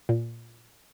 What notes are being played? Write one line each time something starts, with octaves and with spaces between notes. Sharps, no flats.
A#2